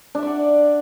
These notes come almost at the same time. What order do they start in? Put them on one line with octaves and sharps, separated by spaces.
D4 E5 D5 F#5